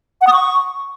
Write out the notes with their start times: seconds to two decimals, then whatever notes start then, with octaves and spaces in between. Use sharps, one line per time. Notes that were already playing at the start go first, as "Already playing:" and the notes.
0.21 F#5
0.27 D#6
0.33 C#6